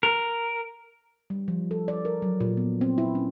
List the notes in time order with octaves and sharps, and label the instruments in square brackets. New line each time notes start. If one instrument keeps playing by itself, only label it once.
[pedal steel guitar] A#4
[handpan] G3
F3
A4
D5
A#4
F#3
A#2
B3
C4
E4
C#4